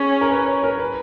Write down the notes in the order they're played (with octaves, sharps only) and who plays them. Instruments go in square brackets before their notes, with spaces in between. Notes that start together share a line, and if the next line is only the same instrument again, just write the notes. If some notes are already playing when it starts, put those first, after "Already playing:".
Already playing: [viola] C#4 [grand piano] G#4
[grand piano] A#4
B4
C#5
A#4
B4